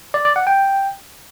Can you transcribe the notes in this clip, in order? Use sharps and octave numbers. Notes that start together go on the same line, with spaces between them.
D5
D5
F#5
G5